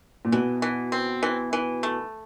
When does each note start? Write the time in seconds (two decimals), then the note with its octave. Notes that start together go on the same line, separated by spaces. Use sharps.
0.25 A#2
0.32 B2 E3
0.62 E3
0.92 C4
1.23 E3
1.53 E3
1.83 A3